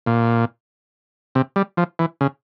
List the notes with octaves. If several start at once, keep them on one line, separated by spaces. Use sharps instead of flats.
A#2
C3
G3
F3
E3
C#3